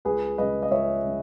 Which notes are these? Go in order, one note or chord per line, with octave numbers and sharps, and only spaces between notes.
C#2 G#4 B4
C#3 G#3 B4 D#5
D#5
C#2 C#5 E5
C#3 G#3